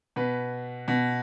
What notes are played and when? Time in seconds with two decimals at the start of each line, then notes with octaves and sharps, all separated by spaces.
0.16 B2 B4
0.88 B2